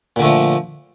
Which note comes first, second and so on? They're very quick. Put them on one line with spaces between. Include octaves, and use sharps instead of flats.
A#2 D3 A3 F3